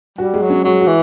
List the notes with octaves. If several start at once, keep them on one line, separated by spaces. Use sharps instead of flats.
G3 F#4
G#3
F#3
C#4
F#3 G#3
F#4
E3